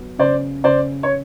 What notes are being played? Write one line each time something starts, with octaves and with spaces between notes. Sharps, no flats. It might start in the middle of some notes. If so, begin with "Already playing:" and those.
Already playing: F#3 B3
C#3 C5 D5
C#3 C5 D5
C#5